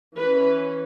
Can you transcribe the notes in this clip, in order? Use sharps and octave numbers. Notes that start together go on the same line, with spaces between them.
E3 C#4 B4